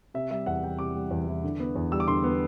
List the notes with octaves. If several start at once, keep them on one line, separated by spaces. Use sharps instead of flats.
C3 E5
G3 E5
E2 F#5
E3 G5
C3 D6
G3
E2
E3
D3
B3
E2
G3 E6
D6
D3 C6
B3